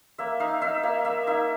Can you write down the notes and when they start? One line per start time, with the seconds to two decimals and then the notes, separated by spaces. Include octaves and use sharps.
0.18 A#3 E5
0.40 D#4 F5
0.62 D#4 E5
0.83 A#3 F5
1.05 A#3 E5
1.27 D#4 E5